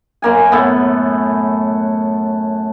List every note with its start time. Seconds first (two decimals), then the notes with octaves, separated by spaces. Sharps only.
0.22 F#2 A#3 G#5
0.52 A2 A3 B3